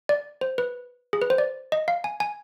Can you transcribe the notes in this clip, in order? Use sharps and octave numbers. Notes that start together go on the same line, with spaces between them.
D5
C5
B4
G#4
B4
C5
D5
D#5
F5
G#5
G#5